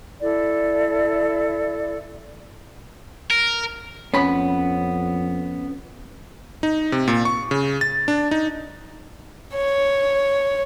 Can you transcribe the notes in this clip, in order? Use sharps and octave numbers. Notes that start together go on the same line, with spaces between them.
E4 A4 D5
A#4
F2 B3 C#4 B5
D#4
C3
A#2
C#6
C#3
A6
D4
D#4
C#5